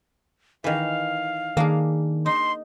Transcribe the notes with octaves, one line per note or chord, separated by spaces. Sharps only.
D#3 E3 F5
D#3 A#3 D4 G#4
D#4 C6